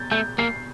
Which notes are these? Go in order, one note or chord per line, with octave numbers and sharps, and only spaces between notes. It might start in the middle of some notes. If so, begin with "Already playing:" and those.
Already playing: G6 A6
A3 G6
A#3 C7